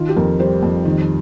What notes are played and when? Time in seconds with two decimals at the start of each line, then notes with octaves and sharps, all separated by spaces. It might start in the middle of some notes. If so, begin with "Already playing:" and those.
Already playing: D#3 F4
0.09 G4
0.16 F2 A#4
0.39 G3 C5
0.63 F2
0.85 D#3